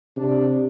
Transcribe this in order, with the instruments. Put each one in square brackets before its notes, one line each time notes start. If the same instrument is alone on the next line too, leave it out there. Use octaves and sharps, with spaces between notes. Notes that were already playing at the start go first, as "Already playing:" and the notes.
[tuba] C3 [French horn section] D4